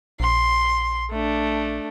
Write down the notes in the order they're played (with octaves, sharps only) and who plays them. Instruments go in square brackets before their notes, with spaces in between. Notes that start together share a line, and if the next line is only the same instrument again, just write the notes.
[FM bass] A#1 [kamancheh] C6
[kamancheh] A3 D4